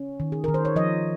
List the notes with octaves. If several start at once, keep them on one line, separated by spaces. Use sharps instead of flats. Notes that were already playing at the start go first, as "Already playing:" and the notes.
Already playing: C#4
D#3
G#4
D#3 A#4
C5
C#5
F3 D#5